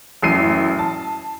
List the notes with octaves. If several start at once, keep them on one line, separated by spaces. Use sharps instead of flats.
A1 F#2 C7 D#7
A5